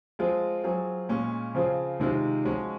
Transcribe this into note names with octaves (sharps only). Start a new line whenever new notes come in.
F3 G#3 C4 F4 G#4
F#3 C4 F4 G#4
A#2 G#3 C#4
C#3 F3 C4 F4 G#4
C3 D#3 G#3 C4 F4
F3 G#3 C#4 F#4